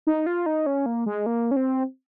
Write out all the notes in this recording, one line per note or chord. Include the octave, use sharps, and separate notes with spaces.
D#4
F4
D#4
C#4
A#3
G#3
A#3
C#4
C4